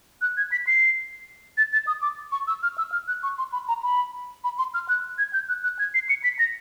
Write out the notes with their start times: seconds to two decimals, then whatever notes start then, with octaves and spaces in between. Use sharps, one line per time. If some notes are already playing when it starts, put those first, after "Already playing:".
0.21 F#6
0.37 G#6
0.52 B6
0.67 C7
1.58 A6
1.73 A6
1.87 D#6
2.02 D6
2.32 C#6
2.47 E6
2.63 F6
2.78 E6
2.92 F6
3.08 F#6
3.23 C#6
3.38 C6
3.52 B5
3.68 A#5
3.83 B5
4.44 B5
4.58 C6
4.74 F6
4.89 F#6
5.18 G#6
5.33 G6
5.49 F#6
5.64 F#6
5.79 G#6
5.94 C7
6.09 C#7
6.24 B6
6.39 A#6